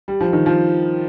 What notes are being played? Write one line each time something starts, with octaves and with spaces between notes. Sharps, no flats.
G3
F3
D#3
F3